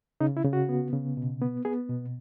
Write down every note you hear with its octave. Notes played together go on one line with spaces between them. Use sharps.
C#3 D#4
E4
C#3
F#4
B3
C#3
B2
B3
B3 G#4
B2